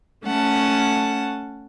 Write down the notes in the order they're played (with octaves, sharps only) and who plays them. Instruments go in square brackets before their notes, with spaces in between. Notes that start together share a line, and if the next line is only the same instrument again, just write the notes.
[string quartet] A3 C#4 F#5 A5